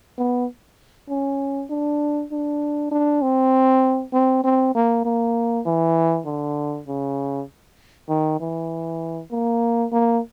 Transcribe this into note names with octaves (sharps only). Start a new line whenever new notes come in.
B3
C#4
D4
D4
D4
C4
C4
C4
A#3
A#3
E3
D3
C#3
D#3
E3
A#3
A#3